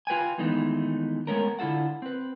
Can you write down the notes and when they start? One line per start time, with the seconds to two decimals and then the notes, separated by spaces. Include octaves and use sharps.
0.07 F4 B4 G5 G#5
0.38 D#3 E3 G#3 A3 B3 D#4
1.27 G#3 A3 B3 C#4 A#4
1.59 D3 E4 F4 A4 F#5
2.02 C4 B4